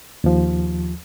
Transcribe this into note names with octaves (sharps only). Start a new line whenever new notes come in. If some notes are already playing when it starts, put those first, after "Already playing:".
D#2 F3